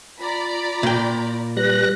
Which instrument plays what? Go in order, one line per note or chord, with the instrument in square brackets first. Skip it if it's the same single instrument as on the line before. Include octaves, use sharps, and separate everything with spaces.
[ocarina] F4 [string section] D5 A#5 B5
[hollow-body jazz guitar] A#2 G5
[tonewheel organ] G3 F#6 A#6 [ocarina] B4